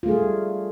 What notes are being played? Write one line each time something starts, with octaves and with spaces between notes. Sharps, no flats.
G3 A3 F4 G#4